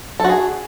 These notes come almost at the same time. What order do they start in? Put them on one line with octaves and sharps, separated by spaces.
A4 F#4 G#4